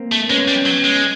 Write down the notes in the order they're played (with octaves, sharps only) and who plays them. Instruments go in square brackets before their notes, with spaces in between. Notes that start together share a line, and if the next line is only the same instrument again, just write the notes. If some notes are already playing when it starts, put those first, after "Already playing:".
Already playing: [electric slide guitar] A#3 C4
[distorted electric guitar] A3
[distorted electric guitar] G#3 [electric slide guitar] B3 C#4
[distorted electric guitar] G3
F#3
G#3